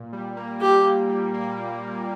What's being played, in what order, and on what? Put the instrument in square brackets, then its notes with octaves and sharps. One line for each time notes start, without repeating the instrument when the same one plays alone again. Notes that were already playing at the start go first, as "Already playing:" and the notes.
Already playing: [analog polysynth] A#2
G3
A#3
[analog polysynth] G3 [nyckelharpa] G4
[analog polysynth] A#2
G3
A#3